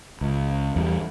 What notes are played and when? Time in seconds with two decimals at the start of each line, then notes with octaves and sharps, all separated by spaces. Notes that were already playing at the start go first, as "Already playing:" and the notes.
0.21 C#2
0.76 E2 G3